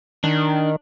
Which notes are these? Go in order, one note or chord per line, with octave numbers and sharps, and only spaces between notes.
D#3 D4